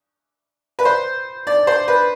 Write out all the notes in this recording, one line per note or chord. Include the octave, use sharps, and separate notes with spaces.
B4
C5
D5
C5
B4